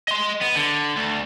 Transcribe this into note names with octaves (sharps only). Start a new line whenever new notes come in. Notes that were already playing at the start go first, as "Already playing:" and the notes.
D#5 C6
B3
D3
D2